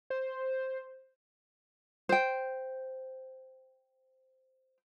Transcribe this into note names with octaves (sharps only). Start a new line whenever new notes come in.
C5
C5 G5